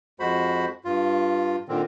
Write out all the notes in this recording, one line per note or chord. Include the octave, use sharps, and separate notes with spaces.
F2 G#3 F#4 C5 B5
G2 F4
A#2 D3 D#3 C4